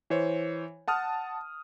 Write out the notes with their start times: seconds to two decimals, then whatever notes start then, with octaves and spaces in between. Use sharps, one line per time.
0.10 E3 C5 C#5
0.88 F#5 A5 D#6 F6